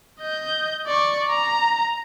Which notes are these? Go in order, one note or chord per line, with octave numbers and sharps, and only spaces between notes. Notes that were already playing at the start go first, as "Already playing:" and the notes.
D#5 G6
D5 C#6
A#5